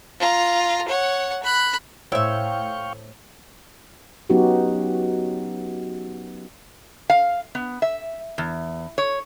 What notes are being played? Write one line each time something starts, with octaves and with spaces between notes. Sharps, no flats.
F4 A#5
C#5 F#5
B5 F#6
A2 E4 C5 C#5 E5 F5 G5 C#6
F#3 B3 C#4 D#4 F#4 G4
F5
B3
E5
E2
C#5